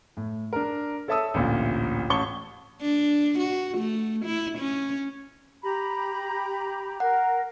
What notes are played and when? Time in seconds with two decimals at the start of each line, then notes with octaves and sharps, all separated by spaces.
0.17 A2
0.53 D4 A#4
1.08 A4 C#5 E5 A5 D#6 E6
1.34 A1 D2 A#2 F4
2.10 A1 C#5 A5 C#6 G7
2.81 D4
3.39 F#4
3.78 A3
4.25 E4
4.58 C#4
5.63 G4 A#5 B5
7.00 A#4 F#5